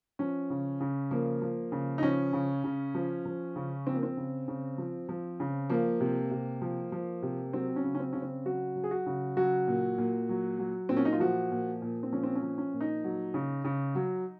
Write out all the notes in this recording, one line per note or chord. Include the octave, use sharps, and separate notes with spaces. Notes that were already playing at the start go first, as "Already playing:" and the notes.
F3 C#4
C#3
C#3
F3 A#3
F3
C#3
D#4
F3 C#4
C#3
C#3
F3
F3
C#3
F3 C4
A#3
C4
C#3
C#3
F3
F3
C#3
F3 A#3
C3
C3
F3
F3
C3
F#3 C4
C#4
C#3
C#4
C4
C#3 C#4
C4
F#3 F#4
F#3
G#4
F#4
C#3
F#3 F#4
A#2
A#2
F#3
F#3
A#2 C4
C#4
D#4
F4
F3 F#4
A#2
A#2
C4
F3 C#4
C4
C#4
F3
C#4
A#2
D#4
F#3
C#3
C#3
F#3